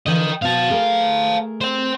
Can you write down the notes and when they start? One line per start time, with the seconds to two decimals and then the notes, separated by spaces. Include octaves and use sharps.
0.06 D3 E3 F3 D#5 G5
0.42 B2 F#4 F5 A5
0.70 A3 G#4 A#4
1.61 C5 G5